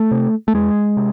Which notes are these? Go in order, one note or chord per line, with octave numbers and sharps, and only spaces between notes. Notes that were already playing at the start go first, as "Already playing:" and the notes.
Already playing: A3
C3
A3
E2 G#3
C3